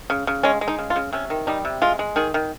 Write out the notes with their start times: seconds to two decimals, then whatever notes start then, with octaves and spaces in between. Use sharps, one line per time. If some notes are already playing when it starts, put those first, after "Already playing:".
0.10 C#3
0.27 C#3
0.43 G#3 C#4
0.61 G#3
0.68 D#4
0.79 C#3
0.90 F4
0.96 C#3
1.13 C3 C#4
1.30 D#3
1.47 G3 D#4
1.65 C3
1.82 G#3 F4
1.99 G#3
2.16 D#3 G#4
2.34 D#3